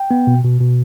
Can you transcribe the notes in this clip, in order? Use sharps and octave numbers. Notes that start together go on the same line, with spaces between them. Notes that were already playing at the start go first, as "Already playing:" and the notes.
Already playing: G5
B3
B2
B2
B2